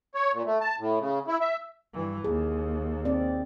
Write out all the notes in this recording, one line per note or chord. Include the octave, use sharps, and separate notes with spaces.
C#5
A#2
A3
A5
A2
C#3
E4
E5
G2 E3
D#2 G#4
C4 D5